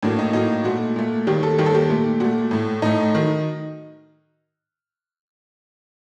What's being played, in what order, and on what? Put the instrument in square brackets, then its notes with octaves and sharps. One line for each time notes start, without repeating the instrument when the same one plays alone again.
[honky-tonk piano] A2 F#3 A#3 D4
D#4
A2 F#3 A#3 D#4
A#2 A3 F#4
A#2 A3
D#2 D#3 G3 G4
A4
D#2 D#3 G3 G4
A4
G4
A#2 A3
A#2 A3 F#4
A2 A3
A2 A3 D#4
D#3 F#3